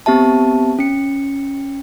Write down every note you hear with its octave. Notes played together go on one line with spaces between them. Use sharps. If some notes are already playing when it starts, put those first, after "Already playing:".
B3 C4 G4 E5 A5
C#4 C#7